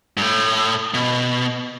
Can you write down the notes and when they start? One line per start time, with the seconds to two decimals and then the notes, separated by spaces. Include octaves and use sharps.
0.17 G2
0.22 A2
0.94 B2